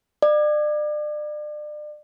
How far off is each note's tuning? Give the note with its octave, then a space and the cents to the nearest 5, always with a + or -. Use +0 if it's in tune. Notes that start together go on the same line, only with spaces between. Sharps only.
D5 +35